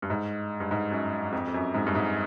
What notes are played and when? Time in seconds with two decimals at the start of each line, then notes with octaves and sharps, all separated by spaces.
0.02 G2
0.10 G#2
0.60 G2
0.71 G#2
0.91 F#2
1.32 F2
1.47 F2
1.54 F#2
1.74 G#2
1.87 G2
1.95 G#2